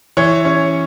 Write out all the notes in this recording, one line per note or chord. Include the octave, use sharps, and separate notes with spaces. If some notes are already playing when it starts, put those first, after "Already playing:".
E3 C#5
C#4